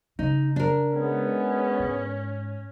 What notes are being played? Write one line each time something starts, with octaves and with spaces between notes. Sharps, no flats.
C#3 D#4
D4 A#4
G#3 B3 C#4
G#2